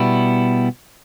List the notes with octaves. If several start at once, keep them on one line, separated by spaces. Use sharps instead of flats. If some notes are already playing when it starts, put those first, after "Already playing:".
Already playing: B2 G3 B3 E4